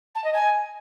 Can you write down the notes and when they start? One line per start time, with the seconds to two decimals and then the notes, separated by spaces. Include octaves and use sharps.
0.15 A5
0.24 D#5
0.33 G#5